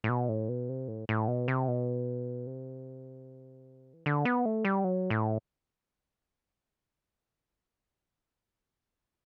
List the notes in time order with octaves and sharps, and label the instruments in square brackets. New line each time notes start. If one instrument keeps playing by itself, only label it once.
[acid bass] A2
B2
A2
B2
C3
A2
A2
B2
C3
B2
C3
E3
D3
B3
A3
G3
F#3
A2